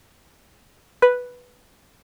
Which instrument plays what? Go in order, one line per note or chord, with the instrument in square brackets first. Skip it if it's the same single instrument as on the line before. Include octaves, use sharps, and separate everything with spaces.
[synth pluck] B4